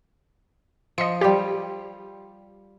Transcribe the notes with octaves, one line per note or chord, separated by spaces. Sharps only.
F3 D#5 C#7
G3 F4 G4